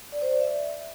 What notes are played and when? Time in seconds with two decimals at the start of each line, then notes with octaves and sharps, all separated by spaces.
0.12 D5
0.22 C5
0.31 D5
0.41 E5